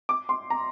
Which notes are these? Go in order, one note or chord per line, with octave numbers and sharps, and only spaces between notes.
D6
C6
A#5